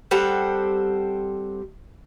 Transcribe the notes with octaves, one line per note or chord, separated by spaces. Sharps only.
G3 C4 A4 F#5